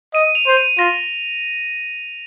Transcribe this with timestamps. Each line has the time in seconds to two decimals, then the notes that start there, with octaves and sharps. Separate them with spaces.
0.14 D#5 D#7
0.35 F7
0.47 C5
0.57 D#7
0.78 F4 A#6